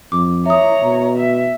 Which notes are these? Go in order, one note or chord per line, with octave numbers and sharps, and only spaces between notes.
F2 D6
C#5 E5 A#5 D#6
B2
E5